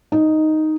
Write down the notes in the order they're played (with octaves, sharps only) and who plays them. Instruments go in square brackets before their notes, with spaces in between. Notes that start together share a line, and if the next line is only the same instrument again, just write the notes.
[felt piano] D#4